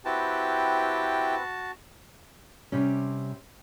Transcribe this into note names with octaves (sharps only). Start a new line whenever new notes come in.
C4 E4 F#4 G4 B4 G5 A5
C3 G3 C#4